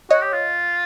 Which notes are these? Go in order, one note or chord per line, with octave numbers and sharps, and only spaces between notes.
F#4 C#5 D#5
G4
F4